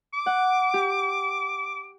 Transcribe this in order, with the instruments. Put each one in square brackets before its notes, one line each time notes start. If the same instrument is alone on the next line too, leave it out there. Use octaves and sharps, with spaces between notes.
[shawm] D6
[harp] F#5
G4